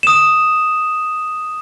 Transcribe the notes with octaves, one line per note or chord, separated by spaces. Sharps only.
D#6 E7